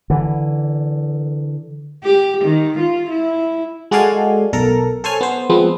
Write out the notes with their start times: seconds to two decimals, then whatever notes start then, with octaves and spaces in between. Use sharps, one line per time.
0.10 D3 E3
2.03 G4
2.45 D#3
2.79 F4
3.10 E4
3.91 G#3 F#4 A4 D5 F5 G#5
4.53 B1 A4 A#4 A#5
5.04 A4 C5 C#5 G#5 F6
5.21 B3 C5
5.49 F3 G#3 B3 C4